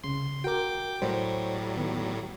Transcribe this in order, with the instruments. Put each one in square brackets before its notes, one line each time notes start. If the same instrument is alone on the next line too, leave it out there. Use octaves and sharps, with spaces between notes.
[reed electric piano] C2 C#3 [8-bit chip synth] C6
[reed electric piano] F#4 A#4 [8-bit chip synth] G5 D6
[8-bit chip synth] A2 F#3 G3 [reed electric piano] C5 C#5
[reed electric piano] D#3 B3